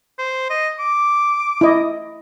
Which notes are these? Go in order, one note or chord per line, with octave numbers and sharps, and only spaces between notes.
C5
D#5
D6
E4 D#5